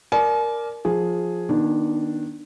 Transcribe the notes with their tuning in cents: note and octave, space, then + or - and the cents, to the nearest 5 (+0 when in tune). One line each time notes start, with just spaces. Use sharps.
A#4 +0 D5 +0 G#5 +45
F3 +15 G#4 +0
D#3 -10 B3 -40 D4 +0